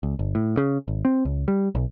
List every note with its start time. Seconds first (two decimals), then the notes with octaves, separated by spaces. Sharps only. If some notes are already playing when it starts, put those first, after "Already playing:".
0.03 C#2
0.19 G1
0.35 A2
0.57 C#3
0.88 G#1
1.05 C4
1.25 C#2
1.48 G3
1.75 B1